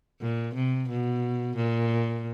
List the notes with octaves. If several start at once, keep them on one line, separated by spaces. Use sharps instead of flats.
A#2
C3
B2
A#2